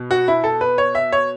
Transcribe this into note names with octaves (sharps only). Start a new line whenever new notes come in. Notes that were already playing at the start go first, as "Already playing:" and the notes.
Already playing: B2
F#4
E4
A4
B4
C#5
E5
C#5